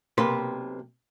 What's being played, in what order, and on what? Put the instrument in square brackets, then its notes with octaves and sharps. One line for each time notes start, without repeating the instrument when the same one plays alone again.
[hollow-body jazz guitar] B1 C3 A#3 B4 C6